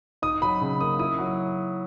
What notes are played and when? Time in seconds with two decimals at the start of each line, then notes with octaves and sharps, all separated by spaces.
0.22 D#4 D#6
0.41 F#3 B5
0.61 C#3
0.80 A#3 D#6
0.99 E4 D#6
1.18 F#3